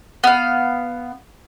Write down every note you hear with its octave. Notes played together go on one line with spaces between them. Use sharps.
B3 F5